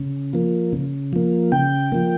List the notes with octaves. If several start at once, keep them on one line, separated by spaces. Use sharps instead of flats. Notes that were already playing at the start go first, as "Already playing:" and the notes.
Already playing: C#3
F3 A#3
C#3
F3 A#3
C#3 G5
F3 A#3